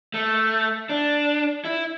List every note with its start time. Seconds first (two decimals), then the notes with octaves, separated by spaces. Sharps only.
0.14 A3
0.90 D4
1.65 E4